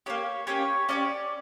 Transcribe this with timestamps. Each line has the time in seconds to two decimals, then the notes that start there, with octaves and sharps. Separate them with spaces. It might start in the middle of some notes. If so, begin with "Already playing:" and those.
0.06 A#3 D4 G4 C#5
0.47 A#3 C#4 G4 C#5
0.89 C#4 E4 G4 D5